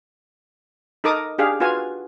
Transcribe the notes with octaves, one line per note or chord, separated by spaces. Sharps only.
D#4 A4 A#4 D6 D#6
D4 G4 G#4 F5
F4 F#4 B4 F5 G#5